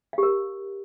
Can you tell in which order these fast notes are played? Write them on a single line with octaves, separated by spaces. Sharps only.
F5 G4 A#4